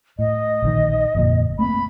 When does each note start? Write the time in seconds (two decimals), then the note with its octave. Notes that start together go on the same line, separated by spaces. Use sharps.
0.19 A2 D#5
0.62 A#1 D3 D#3
1.15 G1 F2 A#2
1.59 A3 A#3 C4 B5